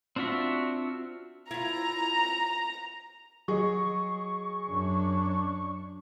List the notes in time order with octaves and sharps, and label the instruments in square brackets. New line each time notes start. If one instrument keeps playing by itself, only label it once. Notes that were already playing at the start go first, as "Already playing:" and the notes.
[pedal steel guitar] C4 D4 F4 F#4 E5
[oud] E4 F4 [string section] A#5
[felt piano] F#3 G#4 D#5 [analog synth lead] C#6
[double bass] F#2 D4